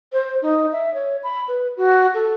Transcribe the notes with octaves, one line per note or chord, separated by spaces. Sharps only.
C5
D#4
E5
C#5
B5
B4
F#4
A4